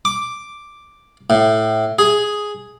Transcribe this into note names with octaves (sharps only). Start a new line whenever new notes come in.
D6
A2
G#4